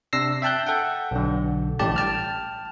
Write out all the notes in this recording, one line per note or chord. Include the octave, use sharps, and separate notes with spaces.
C3 D4 E6 A#6 C7
E5 G5 A5 F#6 G6
A4 F#5 G5
B1 D3
A1 A2 G3 G4 D5 A5
G5 A5 F6